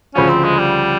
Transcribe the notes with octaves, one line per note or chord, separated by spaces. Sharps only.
D2 C#3 F3 C#4
C4
G#3
G3